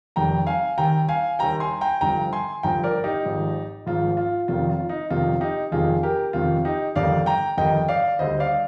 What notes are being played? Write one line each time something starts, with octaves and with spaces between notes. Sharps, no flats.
F1 F2 D#3 G3 G5 A#5
F5 G#5
D#2 D#3 G3 G5 A#5
F5 G#5
D#2 D#3 G3 G5 A#5
G#5 C6
G5 A#5
G1 G2 F3 G5 A#5
G#5 C6
G1 G2 F3 G5 A#5
A#4 D5
D#4 G4
G#1 G#2 F3
G#1 G#2 F3 F4
F4
F1 F2 C3 D#3 F4
F4
D#4
F1 F2 C3 D#3 F4
D#4 G4
F1 F2 C3 D#3 F4 G#4
G4 A#4
F1 F2 C3 D#3 F4
D#4 G4
G1 F2 D#3 G3 D5 F5
G5 A#5
G1 F2 D#3 G3 D#5 G5
D5 F5
D2 D3 G3 C5 D#5
D5 F5